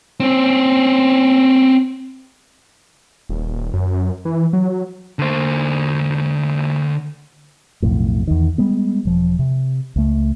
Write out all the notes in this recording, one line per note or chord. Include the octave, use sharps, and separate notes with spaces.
C4 C#4
D#1
F#2
E3
F#3
D3 C5
B1 F2 A2
E2 D#3
G3 G#3 B3
E1 F3
C3
C#2 A3